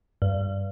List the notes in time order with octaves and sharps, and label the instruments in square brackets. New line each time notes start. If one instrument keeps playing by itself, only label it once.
[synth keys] G2